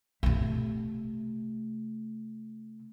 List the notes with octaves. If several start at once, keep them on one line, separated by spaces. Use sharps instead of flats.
C3 A3